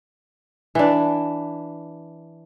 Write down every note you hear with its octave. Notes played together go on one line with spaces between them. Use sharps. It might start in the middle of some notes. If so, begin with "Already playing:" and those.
E3 D4